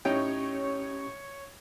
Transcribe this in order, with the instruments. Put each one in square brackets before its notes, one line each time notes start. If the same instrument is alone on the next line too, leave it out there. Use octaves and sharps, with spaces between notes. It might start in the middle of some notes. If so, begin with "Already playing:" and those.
[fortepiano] A2 D#4 G5 [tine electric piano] C#4 G4 [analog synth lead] C#5